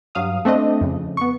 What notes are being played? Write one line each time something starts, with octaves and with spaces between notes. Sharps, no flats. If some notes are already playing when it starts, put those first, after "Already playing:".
G2 F#3 F5 D#6
A3 C4 D4 D#5
F2 C#3
B3 C#6